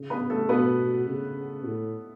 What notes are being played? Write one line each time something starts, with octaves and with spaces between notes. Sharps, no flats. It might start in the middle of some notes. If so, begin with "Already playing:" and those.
Already playing: C#3
B3 B4
A3 A4
B2 B3 B4
C#3
A2